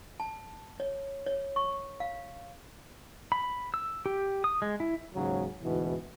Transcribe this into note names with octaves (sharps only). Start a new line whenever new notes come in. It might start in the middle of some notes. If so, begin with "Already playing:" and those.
A5
C#5
C#5
C#6
F5
B5
E6
G4
D#6
G#3
E4
D#2 G#2 C#3 F#3 F#4
D2 G#2 B2 E3